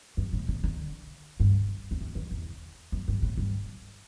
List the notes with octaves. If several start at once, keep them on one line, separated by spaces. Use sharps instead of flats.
F#2
A2
C3
D3
G2
E2
F#2
E2
E2
F#2
G2
A2
G2